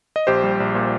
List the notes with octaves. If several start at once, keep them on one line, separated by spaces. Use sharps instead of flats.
D#5
A#1 G4 C5
G3
A#1
A#2